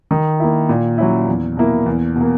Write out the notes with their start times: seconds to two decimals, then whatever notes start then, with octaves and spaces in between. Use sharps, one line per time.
0.11 D#3
0.40 A#3 E4
0.69 A#2
0.98 F#3 C#4 E4
1.27 E2
1.57 B2 A#3 E4
1.86 E2
2.16 B2
2.21 A#3